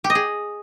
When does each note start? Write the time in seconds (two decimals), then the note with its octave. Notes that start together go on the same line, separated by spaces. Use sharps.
0.04 G4
0.10 D#5
0.15 G#4